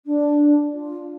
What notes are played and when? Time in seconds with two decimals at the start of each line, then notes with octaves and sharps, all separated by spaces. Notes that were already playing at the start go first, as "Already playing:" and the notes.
0.05 D4
0.72 F4